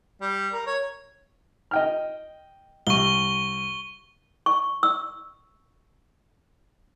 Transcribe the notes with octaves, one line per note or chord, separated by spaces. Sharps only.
G3
A#4
C#5
D#5 G5 F6
C2 C#6 G7
C#6
E6